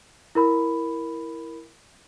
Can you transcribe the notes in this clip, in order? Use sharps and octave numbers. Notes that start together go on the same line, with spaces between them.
E4 A#4 B5